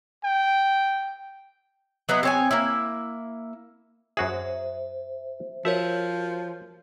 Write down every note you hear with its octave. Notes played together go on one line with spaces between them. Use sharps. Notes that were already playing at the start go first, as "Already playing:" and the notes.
G5
F#3 B3 D#4 E4
C4 C#5 G#5
A#3 E4
F#2 F#4 G#4 C5 E5
F3 F#4 A#4 C#5 E5